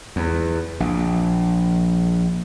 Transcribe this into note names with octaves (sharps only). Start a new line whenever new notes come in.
E2
A#1